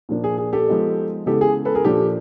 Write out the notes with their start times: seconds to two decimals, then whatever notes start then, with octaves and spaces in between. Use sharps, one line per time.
0.09 A#2 F3 A#3 D4
0.24 G#4
0.38 G#4
0.53 G4 A4
0.68 F3 G#3 B3 D#4
1.26 C#3 E3 G#3 B3 G4 A4
1.41 G#4
1.65 A4 B4
1.75 G#4 A#4
1.84 A#2 F3 A#3 D4 G4 A4